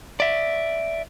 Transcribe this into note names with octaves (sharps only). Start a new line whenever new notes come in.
D5 E5